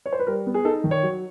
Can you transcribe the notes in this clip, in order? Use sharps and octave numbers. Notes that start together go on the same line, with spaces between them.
C#5
C5
B4
G3 A#4
B3
G#4
D#4 A4
D#3
C#5
F#3